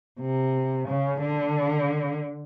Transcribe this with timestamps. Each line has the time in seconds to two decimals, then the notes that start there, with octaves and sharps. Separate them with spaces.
0.20 C3
0.88 C#3
1.22 D3